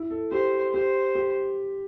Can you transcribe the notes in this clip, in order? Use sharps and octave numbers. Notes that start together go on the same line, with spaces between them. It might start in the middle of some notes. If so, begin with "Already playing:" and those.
Already playing: E4
A4
G4 C5
G4 C5
G4